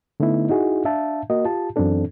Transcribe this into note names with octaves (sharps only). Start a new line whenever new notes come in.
D3 A3 B3 D#4 E4
D#4 E4 F#4 G#4
D4 E5 F5 A5
A#3 F#4 A#4 D#5
F4 G4 A5
F#2 E3 C4 D4 A4